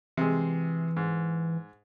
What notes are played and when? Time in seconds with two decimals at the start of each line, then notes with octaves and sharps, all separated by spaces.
0.17 C3 E3 G#3
0.97 G#2